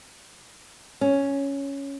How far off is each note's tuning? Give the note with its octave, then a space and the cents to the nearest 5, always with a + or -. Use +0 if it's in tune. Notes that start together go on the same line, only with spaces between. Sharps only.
C#4 +0